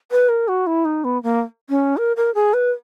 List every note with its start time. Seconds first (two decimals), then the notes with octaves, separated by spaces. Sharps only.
0.11 B4
0.29 A#4
0.48 F#4
0.67 E4
0.85 D#4
1.04 B3
1.23 A#3
1.70 C#4
1.97 A#4
2.17 A#4
2.35 G#4
2.54 B4